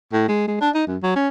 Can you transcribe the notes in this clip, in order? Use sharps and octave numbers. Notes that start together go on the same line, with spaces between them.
A2
G#3
G#3
D4
D#4
F#2
F#3
C#4